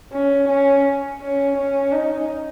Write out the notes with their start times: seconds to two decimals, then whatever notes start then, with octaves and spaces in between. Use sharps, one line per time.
0.13 C#4
0.49 C#4
1.21 C#4
1.57 C#4
1.92 D#4